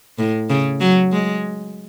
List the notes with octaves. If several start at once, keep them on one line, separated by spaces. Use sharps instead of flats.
A2
C#3
F#3
G#3